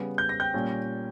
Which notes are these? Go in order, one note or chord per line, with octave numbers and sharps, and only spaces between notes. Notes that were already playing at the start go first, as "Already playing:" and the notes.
Already playing: C#3 G3 B3
G6
A#6
G5 G6
A#2 G3 C#4